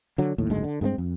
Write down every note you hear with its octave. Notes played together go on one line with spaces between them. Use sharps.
D3 F#3
A#1 D#2 A2
F#1 D2 G#2 G#3
D3
G2 G#3 A3 C4
F2